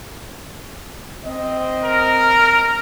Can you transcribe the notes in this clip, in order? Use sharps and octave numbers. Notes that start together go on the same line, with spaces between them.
C4 D#5
A#4